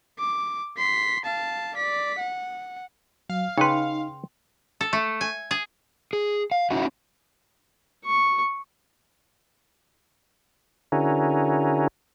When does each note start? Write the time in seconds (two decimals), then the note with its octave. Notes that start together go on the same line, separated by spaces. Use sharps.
0.19 D6
0.78 C6 B6
1.25 F5 A5
1.75 D5 B6
2.19 F#5
3.30 F#3 F5
3.58 C#3 D#4 B4 G5 C6
4.81 A4
4.93 A3
5.21 G#5
5.51 G#4
6.13 G#4
6.51 F5
6.70 C#4 D#4 E4 F#4
8.05 C#6
10.92 D3 C#4 E4 F#4 G#4 A#4